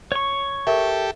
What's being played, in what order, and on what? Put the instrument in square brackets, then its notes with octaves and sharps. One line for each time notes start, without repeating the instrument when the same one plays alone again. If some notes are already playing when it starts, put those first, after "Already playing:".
[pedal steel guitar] C#5 C#6
[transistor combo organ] G4 A4 [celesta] A#4 E5